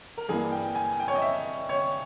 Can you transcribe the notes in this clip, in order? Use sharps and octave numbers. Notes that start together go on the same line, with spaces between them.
A#4
G2 E3 A#3 G#4
G5
G#5
G5
C#5
D#5
E5
C#5